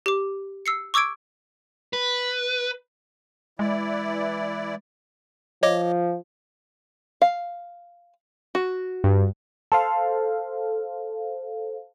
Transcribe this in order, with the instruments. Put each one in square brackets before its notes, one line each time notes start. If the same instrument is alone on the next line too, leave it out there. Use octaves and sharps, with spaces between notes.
[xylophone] G4 D6
E6 C7 C#7
C#6 D6 E6 G#6 D7
[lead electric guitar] B4
[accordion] E3 E4 D5 [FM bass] G#3
[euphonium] F3 [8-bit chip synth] C#5 D#5 D6
[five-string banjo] F5
F#4
[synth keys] G2
[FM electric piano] A4 C5 F5